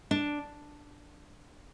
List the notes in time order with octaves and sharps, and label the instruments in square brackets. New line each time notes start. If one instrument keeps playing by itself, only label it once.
[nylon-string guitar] D4